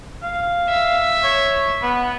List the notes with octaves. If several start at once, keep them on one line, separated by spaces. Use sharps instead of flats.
F5
E5
C#5
B3